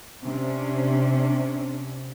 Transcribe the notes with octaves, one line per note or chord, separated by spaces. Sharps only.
C3 C#4 D4